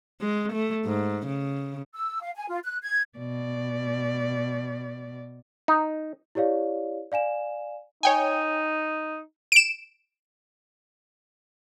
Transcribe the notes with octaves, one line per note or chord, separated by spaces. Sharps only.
G#3
A3
G#2
C#3
E6
F5
G#5
F4
F#6
G#6
B2 D5
D#4
E4 G4 C#5 D5 F5
D5 F5 G#5 E7
D#4 C#5 G5 G#5
D7 E7